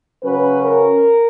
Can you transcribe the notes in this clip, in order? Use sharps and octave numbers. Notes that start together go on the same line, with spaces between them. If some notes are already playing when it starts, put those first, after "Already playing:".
C#3 F#3 C#4 B4
A#4